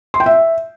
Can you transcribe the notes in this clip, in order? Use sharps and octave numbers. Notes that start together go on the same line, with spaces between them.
C6
G5
E5